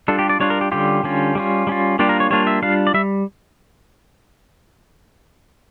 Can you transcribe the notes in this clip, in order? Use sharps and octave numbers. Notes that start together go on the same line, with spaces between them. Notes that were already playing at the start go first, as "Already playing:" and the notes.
G3 D4 F4 A4
G4
D5
G3 D4 F4 C#5
A#4
G4
D3 G3 C#4 F4 G4
D3 G3 C#4 F4
G3 C#4 F4
G3 C#4 F4
G3 A#3 D4 F4 G4
A#4
C#5
G3 A#3 D4 F4 C#5
E5
G3 D4 F4 F5
D5
G3 E5